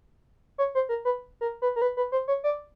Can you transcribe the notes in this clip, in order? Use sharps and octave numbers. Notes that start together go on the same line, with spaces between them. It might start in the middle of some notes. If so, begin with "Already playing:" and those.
C#5
C5
A#4
B4
A#4
B4
A#4
B4
B4
C5
C#5
D5